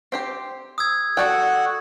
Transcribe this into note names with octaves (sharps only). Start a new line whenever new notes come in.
C4 G4 C5
D#6 E6 G#6
F#4 A4 D5 F#5 G5